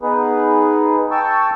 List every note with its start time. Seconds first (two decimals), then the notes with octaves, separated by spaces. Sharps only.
0.01 B3 D#4 G#4 B4
1.11 G5 A5 C#6 E6